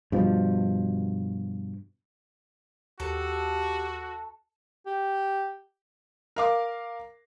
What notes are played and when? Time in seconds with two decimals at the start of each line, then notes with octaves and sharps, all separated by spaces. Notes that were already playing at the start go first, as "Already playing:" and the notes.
0.12 G2 B2 F3
3.00 D#2 F#4 G4 A4
4.86 G4
6.36 A#4 F5 D6